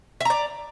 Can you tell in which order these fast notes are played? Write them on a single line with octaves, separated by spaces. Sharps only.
E5 A#5 D5